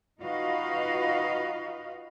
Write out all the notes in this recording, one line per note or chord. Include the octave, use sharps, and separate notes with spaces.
D#4 F4 F#4 B4 D#5 F5